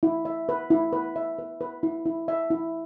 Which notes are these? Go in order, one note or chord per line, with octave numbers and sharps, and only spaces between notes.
E4
E5
B4
E4
B4
E5
B4
B4
E4
E4
E5
E4